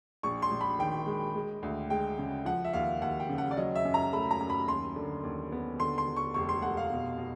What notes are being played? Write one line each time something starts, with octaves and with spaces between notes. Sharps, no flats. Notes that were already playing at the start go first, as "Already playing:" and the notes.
A#1 C#6
C6
A#1
B5
D#3 G5
G#3
G#3
D2
G#3 G5
C#3
F3 F#5
E5
D#2 F5
D#2 F#5
G5
C#3
F#5
D5
F#3 D#5
E5
F#2
A#5
A3 B5
A#5
F#2
B5
D#2 C6
D3
D#2
B3
D3 C6
C6
D3
C#6
F1 C#6
C6
F1 F#5
F5
B2
B2